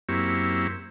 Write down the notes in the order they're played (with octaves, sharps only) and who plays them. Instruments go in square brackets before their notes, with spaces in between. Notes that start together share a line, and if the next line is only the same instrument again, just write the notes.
[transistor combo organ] F#2 A#3 C4 E4 G4 C#6